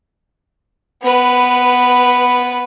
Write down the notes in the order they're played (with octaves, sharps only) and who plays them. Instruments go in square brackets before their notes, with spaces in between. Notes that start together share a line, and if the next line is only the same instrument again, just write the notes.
[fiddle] B3 B4